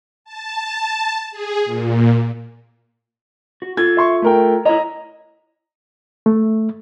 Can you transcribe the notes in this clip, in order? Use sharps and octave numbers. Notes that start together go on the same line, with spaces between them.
A5
G#4
A#2
F#4
F4 A4 G#6
E5 C6 C#6
A3 A#4 G5
E4 C#5 D#5 A#5
A3